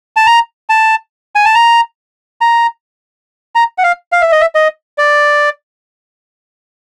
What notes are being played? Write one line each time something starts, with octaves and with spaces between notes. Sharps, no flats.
A5
A#5
A5
G#5
A5
A#5
A#5
A#5
F#5
F5
F5
E5
D#5
E5
D#5
D5